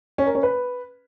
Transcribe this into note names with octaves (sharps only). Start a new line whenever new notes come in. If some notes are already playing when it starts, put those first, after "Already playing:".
C#4
A#4
C#4
B4